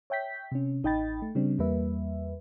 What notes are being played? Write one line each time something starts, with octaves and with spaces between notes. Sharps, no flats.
C#5 E5 G5 G6 B6
C3 C#4
A1 D#4 D#5 G5 B5 A6
A3
C#3 G3 C4 D4
E2 G3 A#3 B4 E5